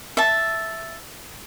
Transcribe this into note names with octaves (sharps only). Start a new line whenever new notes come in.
E5 A5